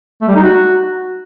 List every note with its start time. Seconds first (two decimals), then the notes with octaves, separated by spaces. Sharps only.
0.21 A3
0.29 G3
0.36 D#4
0.43 F#4